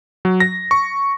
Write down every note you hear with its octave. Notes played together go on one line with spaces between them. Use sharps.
F#3
A#6
C#6